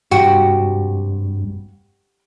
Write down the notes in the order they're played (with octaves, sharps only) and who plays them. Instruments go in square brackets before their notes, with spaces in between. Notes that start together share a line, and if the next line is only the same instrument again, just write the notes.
[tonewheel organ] G2 [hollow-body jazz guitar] C3 G3 [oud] F#4 [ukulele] G5